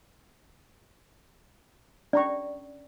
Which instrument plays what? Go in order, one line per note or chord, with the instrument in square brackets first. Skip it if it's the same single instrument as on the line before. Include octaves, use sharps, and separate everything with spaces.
[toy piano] C#4 D5 [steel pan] D4 A#5 C#6